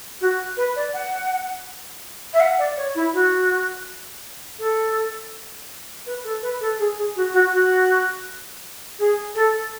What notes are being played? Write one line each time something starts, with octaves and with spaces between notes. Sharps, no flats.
F#4
B4
D5
F#5
E5
F#5
D5
C#5
E4
F#4
A4
B4
A4
B4
A4
G#4
G#4
F#4
F#4
F#4
G#4
A4